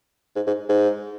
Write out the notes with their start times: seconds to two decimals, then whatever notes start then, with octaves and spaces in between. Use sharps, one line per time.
0.36 G#2
0.47 G#2
0.69 G#2